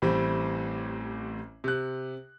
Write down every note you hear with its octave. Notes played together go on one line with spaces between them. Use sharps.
A1 A2 G3 C4
C3 F#6